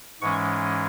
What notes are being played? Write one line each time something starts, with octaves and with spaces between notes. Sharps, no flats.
G#2 E3 G#3 C#4 C#6